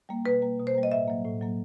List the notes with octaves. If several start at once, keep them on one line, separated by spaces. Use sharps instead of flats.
G3 A#3
B2 B4
G3 A#3
B2
C5
G3 A#3
D#5
A2 E5
F#3 A#3
A2
F#3 A#3